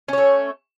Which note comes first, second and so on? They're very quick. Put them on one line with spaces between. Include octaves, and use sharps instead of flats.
C#4 C#5 A3